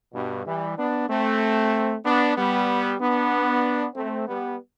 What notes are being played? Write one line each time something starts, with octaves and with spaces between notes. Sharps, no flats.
G2 B2
E3 G3
B3 D4
A3 C4
B3 D4
G3 B3
B3 D4
A3 C4
G3 B3